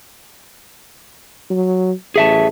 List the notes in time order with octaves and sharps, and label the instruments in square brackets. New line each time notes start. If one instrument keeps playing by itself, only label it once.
[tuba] F#3
[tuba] A1 [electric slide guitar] G#4 E5 A5